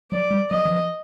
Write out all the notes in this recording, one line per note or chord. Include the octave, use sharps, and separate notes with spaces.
F#3 D5
G3
F#3 D#5
E3
F3